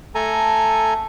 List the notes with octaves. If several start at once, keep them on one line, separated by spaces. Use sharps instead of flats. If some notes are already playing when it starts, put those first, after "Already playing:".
A3 A4 G#5 A#5